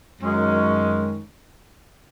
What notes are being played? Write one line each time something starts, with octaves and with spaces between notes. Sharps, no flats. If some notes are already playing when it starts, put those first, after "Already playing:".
F#2 D#3 G#3 C#4